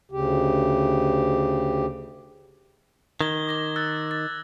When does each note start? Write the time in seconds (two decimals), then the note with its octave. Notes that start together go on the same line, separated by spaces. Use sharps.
0.12 D2 C#3 G4
3.21 D#3 G#6 G7
3.47 D6 A#6 G7
3.76 E6 F#6 A6
4.11 A6